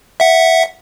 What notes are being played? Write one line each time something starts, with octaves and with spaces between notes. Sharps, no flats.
E5 F#5